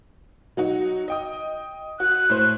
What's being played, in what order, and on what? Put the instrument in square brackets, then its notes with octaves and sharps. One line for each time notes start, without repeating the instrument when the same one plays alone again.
[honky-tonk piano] F#3 D#4 F#4
D#5 G5 D#6
[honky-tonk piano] F#4 [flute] F#6
[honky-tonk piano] A2 C5